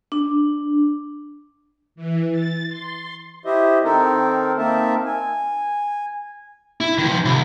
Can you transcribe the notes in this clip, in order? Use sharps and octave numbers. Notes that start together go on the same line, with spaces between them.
D4
E3
A6
C6
E4 G4 C5 D#5 E5
D#3 C4 D#4 A4 A#4 C5
A#3 C4 D#4 A#4 E5 A5
G#5
E4
D#3 F3
C2